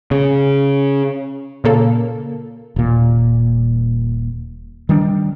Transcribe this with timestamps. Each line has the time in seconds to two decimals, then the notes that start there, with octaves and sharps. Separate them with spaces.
0.11 C#3
1.64 A#2 C#3 A#3 A4
2.76 D#1 A#2
4.89 D#3 G3 D4